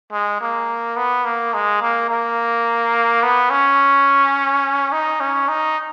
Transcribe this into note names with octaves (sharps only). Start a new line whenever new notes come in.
G#3
A#3
B3
A#3
G#3
A#3
A#3
B3
C#4
D#4
C#4
D#4